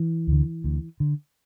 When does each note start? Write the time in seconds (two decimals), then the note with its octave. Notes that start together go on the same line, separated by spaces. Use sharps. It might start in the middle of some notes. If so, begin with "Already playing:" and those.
Already playing: E3
0.27 D2 D3
0.64 D2
1.00 D3